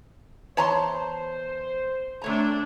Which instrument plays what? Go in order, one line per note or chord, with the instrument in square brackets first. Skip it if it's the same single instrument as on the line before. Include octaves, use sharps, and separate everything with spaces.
[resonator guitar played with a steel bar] E2 A5 [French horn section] C5 [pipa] C#5 A#5 C6
[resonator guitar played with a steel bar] C3 C#5 A#5 [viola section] A3 D4